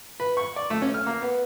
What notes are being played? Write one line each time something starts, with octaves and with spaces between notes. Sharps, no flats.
B4
C#6
D5
A3
C#4
F6
A#3
B3